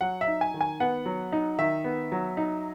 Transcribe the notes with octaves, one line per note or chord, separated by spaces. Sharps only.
F#3 F#5
E5
D#4
G#5
D#3
G#5
B3 F#5
F#3
D#4
D#3 E5
B3
F#3
D#4